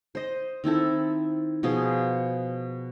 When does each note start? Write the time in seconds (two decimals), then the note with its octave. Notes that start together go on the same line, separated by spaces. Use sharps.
0.15 C5 D#5
0.64 D#3 C4 E4 A4
1.63 B2 F3 G#4 C6